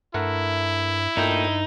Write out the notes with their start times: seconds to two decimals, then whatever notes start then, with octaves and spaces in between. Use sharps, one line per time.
0.14 G2 A3 E4 A#4 F#5
1.17 G2 A#2 A3 D#4 G5